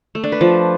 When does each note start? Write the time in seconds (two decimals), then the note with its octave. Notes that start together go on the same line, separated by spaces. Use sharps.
0.15 A3
0.24 D4
0.32 B4
0.41 F3